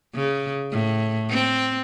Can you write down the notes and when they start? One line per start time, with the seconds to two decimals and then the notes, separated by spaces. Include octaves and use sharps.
0.15 C#3
0.72 A2
1.30 C4